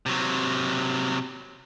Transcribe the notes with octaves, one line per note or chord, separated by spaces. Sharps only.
C3 F#3